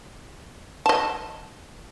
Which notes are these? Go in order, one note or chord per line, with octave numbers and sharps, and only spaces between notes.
D#5 A5